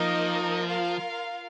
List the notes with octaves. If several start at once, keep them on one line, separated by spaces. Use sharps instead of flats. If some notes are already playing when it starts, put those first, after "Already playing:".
Already playing: F3 A#3 D#4 A#4 D#5
F4 A#4 F5